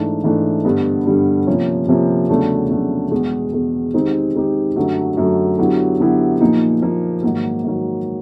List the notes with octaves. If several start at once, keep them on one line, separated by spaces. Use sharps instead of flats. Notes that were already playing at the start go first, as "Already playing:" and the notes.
Already playing: G#2 E3 A3 D4
G#2 E3 A3 D4
G2 D3 G3 B3
G2 D3 G3 B3
C3 F3 A#3 C#4
C3 F3 A#3 C#4
E2 C#3 F#3 A3 D4
E2 C#3 F#3 A3 D4
E2 B2 G#3
E2 B2 G#3
D#3 G#3 C4 D#4 G4
D#3 G#3 C4 D#4 G4
F#2 D3 F#3 A3
F#2 D3 F#3 A3
D3 F#3 B3 E4 G4
D3 F#3 B3 E4 G4
A#2 F3 A#3 D#4
A#2 F3 A#3 D#4
G#2 D#3 F#3 A#3
G#2 D#3 F#3 A#3